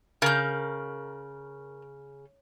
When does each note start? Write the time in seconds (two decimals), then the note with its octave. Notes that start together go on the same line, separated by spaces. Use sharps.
0.22 C#3 A#4 G6